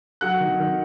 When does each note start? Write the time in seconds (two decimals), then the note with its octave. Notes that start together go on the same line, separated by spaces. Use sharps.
0.21 F#3 F#5 F#6
0.40 D#3
0.60 D#3